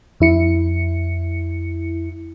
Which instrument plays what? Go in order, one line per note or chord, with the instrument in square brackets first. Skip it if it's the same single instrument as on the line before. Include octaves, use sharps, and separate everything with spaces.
[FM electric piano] F2 E4 C#7